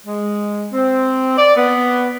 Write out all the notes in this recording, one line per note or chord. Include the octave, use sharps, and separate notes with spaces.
G#3
C4
D5
B3